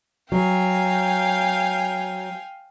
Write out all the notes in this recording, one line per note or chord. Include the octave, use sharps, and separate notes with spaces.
F#3 F5 G5 G#5